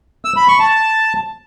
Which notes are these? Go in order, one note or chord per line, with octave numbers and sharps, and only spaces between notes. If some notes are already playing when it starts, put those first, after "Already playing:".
E6
B5
C#6
A5